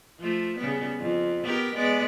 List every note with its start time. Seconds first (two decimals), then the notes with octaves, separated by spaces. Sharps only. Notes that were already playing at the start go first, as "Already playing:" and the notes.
0.19 F3 A3
0.57 C#3 G3 B3
0.99 F2
1.43 B3 G4 A#4
1.75 G#3 B3 D5